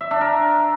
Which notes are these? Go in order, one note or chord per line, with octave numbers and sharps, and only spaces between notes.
E5
D4
A#4